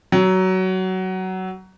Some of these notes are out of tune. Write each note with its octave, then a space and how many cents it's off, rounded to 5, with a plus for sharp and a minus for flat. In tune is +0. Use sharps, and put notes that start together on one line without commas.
F#3 +20